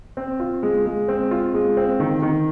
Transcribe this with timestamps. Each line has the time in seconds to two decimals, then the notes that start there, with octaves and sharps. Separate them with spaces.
0.17 C4
0.40 F4
0.63 G#3
0.86 G#3
1.08 C4
1.31 F4
1.54 G#3
1.77 C4
2.00 D#3
2.22 D#3